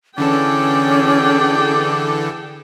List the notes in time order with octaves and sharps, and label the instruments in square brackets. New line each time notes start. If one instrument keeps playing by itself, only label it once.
[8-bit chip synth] D3 E3 A4 [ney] C#4 [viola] G#4 G5 [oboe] D5